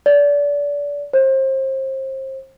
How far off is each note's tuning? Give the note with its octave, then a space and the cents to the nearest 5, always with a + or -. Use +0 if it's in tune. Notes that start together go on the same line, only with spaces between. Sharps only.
D5 -30
C5 +30